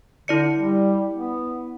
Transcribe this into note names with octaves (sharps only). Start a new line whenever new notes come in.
D3 E4 D5 C#7
G3
B3